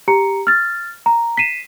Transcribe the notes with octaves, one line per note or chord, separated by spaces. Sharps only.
G4 A#5 C#7
F6 A6
A#5
B6 C7 D#7 E7